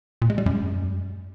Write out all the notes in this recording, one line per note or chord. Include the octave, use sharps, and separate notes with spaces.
A#2
G#3
G3
F#2